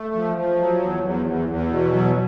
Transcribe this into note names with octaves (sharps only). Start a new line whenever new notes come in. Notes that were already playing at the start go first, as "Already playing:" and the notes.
Already playing: A3
F3
F3
F#3
E2
E2
E2
E2
B2
F#3